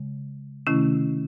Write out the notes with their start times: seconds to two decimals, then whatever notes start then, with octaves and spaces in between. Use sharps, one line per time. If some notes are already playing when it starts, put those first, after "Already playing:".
Already playing: C#3 G#3
0.67 C3 D#3 A3 C#4 E4